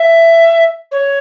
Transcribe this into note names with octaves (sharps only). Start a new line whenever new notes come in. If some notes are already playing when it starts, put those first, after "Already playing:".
Already playing: E5
C#5